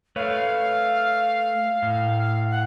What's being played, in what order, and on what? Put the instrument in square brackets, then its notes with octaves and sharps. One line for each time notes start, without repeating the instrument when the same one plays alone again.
[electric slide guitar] A3 B4 C#5 [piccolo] F5
[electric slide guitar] A2
[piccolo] F#5